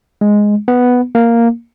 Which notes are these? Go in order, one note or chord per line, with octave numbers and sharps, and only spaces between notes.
G#3
B3
A#3